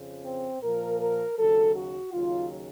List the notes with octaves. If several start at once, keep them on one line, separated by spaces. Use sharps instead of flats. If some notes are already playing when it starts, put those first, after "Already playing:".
Already playing: F2 C#3 F3
C4
A#2 F3 A#4
A#4
D#2 C#3 F#3 A4
F#4
D#2 C#3 F#3 F4